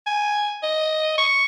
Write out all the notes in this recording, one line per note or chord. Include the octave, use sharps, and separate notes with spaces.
G#5
D#5
C#6